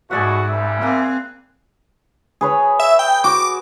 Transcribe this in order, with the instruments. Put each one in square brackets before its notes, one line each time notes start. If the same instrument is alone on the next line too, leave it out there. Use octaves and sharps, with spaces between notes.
[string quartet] G#2 [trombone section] B2 E3 A3 [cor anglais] F#4 [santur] G#4 D5 F#5
[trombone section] C2 F#2 G3 [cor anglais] E5
[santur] A#3 F#5 G#5 [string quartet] C4
[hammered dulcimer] G#4 B4 C#5
[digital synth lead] E5
G5
[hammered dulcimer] F#4 [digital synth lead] D6